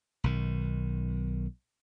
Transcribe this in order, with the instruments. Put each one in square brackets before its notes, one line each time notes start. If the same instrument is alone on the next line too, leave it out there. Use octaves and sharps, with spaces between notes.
[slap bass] B1 D#3